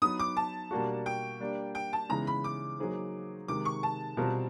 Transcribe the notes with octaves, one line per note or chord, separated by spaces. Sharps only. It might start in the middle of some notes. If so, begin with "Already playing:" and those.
F#3 B3 D#4 D#6
D6
A5
B2 G3 A#3 D4 F#4
G5
G3 A#3 D4
G5
A5
C#3 E3 G#3 B3 D#4 A#5
B5
D6
F#3 A#3 D#4 G#4 C5
C3 D#3 G#3 D6
C#6
A5
B2 G3 C4 F4 A#4